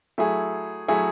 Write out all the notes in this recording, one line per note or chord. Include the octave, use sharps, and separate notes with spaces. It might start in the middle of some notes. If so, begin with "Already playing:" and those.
F#3 A3 E4 G#4
F#3 A3 E4 G#4